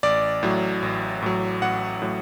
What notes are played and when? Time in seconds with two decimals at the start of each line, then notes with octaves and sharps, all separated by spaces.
0.03 A1 D5
0.43 A2 F#3
0.82 A1
1.22 A2 F#3
1.62 A1 F#5
2.02 A2 F#3